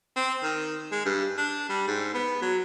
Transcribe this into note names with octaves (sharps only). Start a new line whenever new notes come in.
C4
D#3
G#3
G2
D4
G3
G#2
B3
F#3